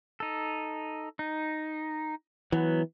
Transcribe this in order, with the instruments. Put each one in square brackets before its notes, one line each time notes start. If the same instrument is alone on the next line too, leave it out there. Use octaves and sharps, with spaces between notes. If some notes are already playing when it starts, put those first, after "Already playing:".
[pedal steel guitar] D#4 A4
D#4
[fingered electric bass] E3 [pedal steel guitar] F#3 B3